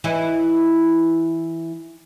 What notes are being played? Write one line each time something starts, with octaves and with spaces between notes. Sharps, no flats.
E3 E4 D#5